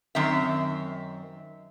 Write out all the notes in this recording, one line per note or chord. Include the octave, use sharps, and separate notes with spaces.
F#2 D#3 C4 E5